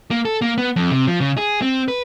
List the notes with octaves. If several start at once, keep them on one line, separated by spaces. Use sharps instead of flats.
A#3
A4
A#3
B3
F2
C3
F3
C#3
G#4
C4
B4